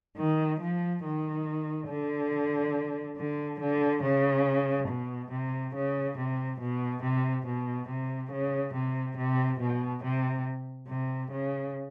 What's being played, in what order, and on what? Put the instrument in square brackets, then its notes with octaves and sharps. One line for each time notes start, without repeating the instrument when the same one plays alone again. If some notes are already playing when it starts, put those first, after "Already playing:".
[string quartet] D#3
F3
D#3
D3
D3
D3
C#3
B2
C3
C#3
C3
B2
C3
B2
C3
C#3
C3
C3
B2
C3
C3
C#3